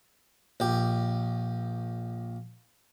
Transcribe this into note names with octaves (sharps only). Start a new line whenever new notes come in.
A#1 G4